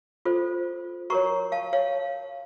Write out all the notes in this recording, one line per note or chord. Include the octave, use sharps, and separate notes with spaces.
F4 A4 C5
F#4 A#4 C#5 A#5 C#6
F5 A5
C#5 F5